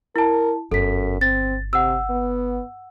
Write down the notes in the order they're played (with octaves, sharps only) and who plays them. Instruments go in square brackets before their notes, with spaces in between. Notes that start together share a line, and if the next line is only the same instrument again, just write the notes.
[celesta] E4 A5 [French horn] A#4
[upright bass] G1 [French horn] F#2 [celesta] A4 B6
[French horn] C4 [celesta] A6
[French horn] C3 [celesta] F#5 E6
[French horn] B3